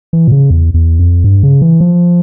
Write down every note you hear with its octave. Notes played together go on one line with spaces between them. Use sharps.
E3
A#2
C#3
E2
E2
F2
G2
C#3
E3
F3